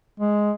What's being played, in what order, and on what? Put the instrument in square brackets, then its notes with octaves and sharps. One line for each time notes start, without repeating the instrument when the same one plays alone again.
[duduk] G#3